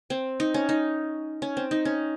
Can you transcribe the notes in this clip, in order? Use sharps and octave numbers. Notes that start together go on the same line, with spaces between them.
C4
D#4
C#4
D#4
C#4
C4
D#4
C#4